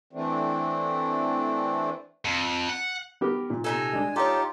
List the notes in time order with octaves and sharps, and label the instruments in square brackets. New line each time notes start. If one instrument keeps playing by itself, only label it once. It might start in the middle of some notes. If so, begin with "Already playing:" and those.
[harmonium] E3 A3 C4 D4
[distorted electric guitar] F2
F#5
[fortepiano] B3 G4 A#4
A#2
[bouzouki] C3 D#4 A4 [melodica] G#5
[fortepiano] G#3 D4 G#4
[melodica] D#4 F4 G4 [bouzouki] A4 C#5